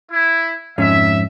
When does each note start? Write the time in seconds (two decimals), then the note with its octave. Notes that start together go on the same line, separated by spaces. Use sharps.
0.11 E4
0.78 F2 G#2 C#4 E5